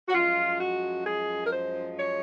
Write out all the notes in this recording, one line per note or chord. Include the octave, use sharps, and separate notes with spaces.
F#4
F#2 F3 G#3 F4
F#4
G#4
A#4
C5
C#5